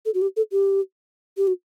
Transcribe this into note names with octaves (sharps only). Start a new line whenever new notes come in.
A4
F#4
G4
A4
G4
G4
F#4